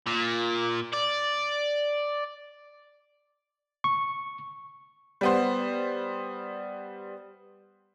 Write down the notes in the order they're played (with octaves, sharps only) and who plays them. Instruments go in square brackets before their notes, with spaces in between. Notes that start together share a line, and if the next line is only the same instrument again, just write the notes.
[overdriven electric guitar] A#2
D5
[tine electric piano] C#6
[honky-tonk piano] G3 B3 C5